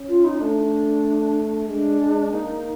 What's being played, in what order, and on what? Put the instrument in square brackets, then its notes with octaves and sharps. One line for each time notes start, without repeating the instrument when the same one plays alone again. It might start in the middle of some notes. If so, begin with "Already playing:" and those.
Already playing: [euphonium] C#4
[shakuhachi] F4
D#4
[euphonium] A3 [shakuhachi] D4
[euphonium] G#3 [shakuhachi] D4
[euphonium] G#3
[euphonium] A#3 [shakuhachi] D#4